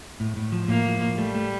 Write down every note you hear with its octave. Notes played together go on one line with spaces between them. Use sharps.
A2
A2
F3
A2 A#3
F3
A2
G3 A3
A3